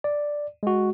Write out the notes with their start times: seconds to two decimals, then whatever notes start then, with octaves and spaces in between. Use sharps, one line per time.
0.04 D5
0.63 G#3 F#4